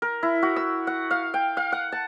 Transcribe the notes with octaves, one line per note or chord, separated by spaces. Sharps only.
A#4
E4
F#4
E6
F#5
F5
G5
F5
F#5
A5